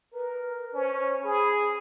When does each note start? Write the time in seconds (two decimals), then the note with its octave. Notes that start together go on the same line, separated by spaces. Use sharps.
0.14 A#4 B4
0.74 C#4 C5
1.24 G#4 B5